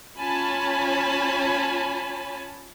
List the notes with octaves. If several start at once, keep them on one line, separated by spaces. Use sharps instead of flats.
C#4 F4 C#5 G#5 A5 B5